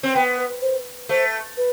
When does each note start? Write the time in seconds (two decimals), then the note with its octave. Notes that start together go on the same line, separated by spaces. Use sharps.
0.03 C4
0.15 B3 G5
0.38 B4
0.62 C5
1.09 A3 C5
1.57 B4